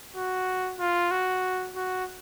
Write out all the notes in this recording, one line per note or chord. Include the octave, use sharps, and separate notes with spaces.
F#4
F4
F#4
F#4